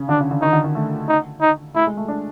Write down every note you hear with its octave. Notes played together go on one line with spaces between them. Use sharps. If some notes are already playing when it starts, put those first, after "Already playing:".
Already playing: C#3
D3 D4
C#3
D3
D#3 D#4
D3
D#3
A3
D#4
D#4
A3 E4
G#3
A3
D4